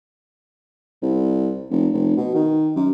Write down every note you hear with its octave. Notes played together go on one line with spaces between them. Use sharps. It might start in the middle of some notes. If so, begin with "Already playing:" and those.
C2
F1
F1
B2
D#3
F#2